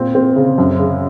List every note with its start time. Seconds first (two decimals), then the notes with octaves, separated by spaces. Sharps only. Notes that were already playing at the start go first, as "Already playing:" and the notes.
Already playing: A#2 C4
0.15 C4
0.36 C#3
0.58 F#2
0.79 C#3